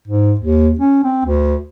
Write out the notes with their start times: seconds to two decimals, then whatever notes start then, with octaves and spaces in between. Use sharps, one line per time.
0.08 G#2
0.39 D#2
0.79 C#4
1.04 C4
1.25 D2